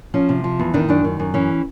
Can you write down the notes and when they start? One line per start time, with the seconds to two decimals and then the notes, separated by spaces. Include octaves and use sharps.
0.14 F3 C#4
0.29 C3
0.44 F3
0.59 E2
0.74 D#3 D4
0.88 F#2 D4
1.04 D#3
1.20 F#2
1.34 E3 C#4